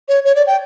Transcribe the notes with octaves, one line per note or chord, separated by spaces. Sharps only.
C#5
C#5
D5
G5